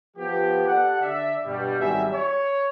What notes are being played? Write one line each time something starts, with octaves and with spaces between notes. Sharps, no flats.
F3 B3 G4
G4 A4 D5 F#5
D3 D5 E5
G2 B2 G3
G#1 F#3 G3 G#4 E5
C#5